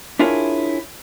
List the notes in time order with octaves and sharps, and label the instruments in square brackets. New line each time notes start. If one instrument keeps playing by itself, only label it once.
[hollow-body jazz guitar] D4 E4 F4 G#4 A#4 C#5